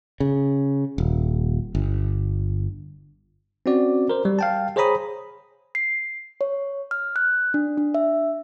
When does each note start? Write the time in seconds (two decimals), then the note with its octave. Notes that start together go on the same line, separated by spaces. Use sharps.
0.20 C#3
0.98 D#1
1.75 G1
3.66 C4 C#4 F#4 D5
4.10 A#4 C5
4.25 G3
4.39 F5 G5 A5
4.76 G#4 C5 C#5 A#5 B5 D#6
5.75 C7
6.41 C#5
6.91 F6
7.16 F#6
7.54 D4
7.78 D4
7.94 E5